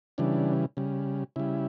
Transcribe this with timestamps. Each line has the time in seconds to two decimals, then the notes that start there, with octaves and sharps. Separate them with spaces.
0.18 C#3 E3 G3 D4
0.77 C#3 G3
1.36 C#3 G3 E4